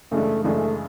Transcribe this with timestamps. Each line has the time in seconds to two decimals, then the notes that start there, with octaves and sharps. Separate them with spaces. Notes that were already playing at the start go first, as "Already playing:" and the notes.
0.11 F#2 C#3 E3 G#3 A3 D4
0.44 F#2 C#3 E3 G#3 A3 D4